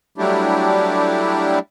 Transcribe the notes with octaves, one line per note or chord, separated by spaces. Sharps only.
F#3 G3 A3 D4 E4 G4